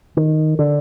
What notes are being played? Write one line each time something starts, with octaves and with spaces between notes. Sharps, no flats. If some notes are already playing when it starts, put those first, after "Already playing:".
D#3
D3